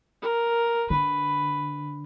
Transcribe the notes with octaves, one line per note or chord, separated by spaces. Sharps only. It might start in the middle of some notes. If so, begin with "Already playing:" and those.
A#4
D3 B4